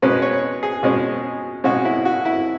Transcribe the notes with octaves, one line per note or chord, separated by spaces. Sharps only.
B2 G#3 C#4 B4
C#5
G#4
B2 G#3 C#4
B2 G#3 C#4 F#4
E4
F#4
E4